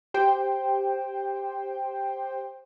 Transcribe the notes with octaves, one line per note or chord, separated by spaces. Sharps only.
G4 C5 G5